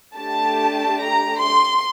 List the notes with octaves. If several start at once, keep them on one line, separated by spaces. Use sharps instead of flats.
A3 D4 G4 A5
A#5
C6